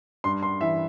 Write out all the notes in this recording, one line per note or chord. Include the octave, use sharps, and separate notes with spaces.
G2 C6
C6
E3 E5